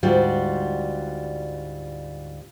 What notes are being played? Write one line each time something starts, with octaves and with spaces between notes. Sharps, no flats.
D2 G#2 G3 F4 F#4